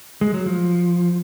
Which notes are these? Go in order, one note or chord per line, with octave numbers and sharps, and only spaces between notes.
G#3
F#3
F3